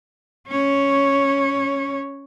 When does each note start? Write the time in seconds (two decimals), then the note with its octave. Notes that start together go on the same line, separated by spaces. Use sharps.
0.48 C#4 C#5